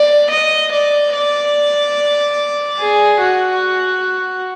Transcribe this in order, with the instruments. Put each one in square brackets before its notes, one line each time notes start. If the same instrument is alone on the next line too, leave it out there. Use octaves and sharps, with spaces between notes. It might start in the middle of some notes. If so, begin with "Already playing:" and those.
Already playing: [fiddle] D5
D#5
D5
D5
G#4
F#4